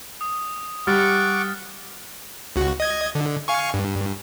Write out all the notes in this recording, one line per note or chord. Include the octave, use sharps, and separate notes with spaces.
D#6
G3 F#5 C#6 D6 F6 A6
C#2 F#4
D#5 G#6
D3
F5 G#5 C#6
G2